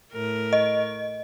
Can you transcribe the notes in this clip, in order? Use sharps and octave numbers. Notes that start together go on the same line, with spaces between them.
A2 A#4
D#5